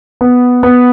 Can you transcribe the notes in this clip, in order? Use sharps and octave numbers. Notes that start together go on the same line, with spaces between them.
B3
B3